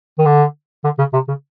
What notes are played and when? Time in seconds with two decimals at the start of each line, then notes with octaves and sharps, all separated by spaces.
0.18 D#3
0.25 D3
0.84 D3
0.98 C#3
1.13 C3
1.28 C#3